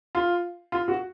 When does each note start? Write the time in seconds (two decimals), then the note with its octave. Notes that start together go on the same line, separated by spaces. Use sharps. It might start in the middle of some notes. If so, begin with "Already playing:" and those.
0.15 F4
0.72 F4
0.88 F#4